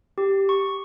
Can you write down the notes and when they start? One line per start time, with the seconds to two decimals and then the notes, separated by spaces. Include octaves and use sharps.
0.18 G4
0.49 C#6